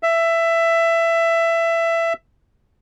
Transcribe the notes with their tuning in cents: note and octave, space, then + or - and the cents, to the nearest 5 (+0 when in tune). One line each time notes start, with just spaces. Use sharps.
E5 +15